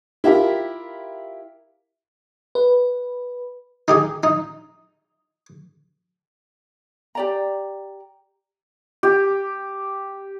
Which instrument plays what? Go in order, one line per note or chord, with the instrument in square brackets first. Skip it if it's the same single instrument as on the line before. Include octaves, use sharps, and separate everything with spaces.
[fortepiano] E4 F4 G4 A#4
[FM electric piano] B4
[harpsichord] D#4 G4 G#4
D#4
[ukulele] G4 D5 A#5
[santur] G4